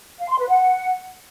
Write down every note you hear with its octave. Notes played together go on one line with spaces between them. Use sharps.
F5
C6
B4
F#5